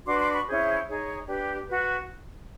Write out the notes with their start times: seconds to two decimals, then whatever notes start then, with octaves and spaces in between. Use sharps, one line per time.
0.07 D4 F#4 B4 C6 D6
0.20 C6 D6
0.33 B5 C#6
0.47 C#4 E4 G#4 C5
0.87 D#4 G#4 C#5
1.27 D4 G4 B4
1.66 F#4 B4